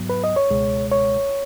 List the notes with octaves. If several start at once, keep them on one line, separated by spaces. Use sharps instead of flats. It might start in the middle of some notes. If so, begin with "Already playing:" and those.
Already playing: G#2 F#3 B3
B4
D#5
C#5
C#2 B2 G#3
C#5